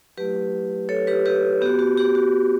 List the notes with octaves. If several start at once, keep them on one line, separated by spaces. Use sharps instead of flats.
F#3 A3 E4 G4 B4
A4 C#5
G4 B4
G4 B4
B3 F#4 G4
F#4
G4
F#4